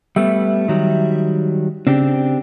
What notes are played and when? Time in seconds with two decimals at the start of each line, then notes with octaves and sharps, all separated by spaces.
0.16 G3 A3 B3 E5
0.68 D#3 F#3 G3
1.87 C#3 C4 D4 G4